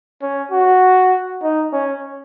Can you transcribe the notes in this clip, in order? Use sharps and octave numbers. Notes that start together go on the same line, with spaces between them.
C#4
F#4
D#4
C#4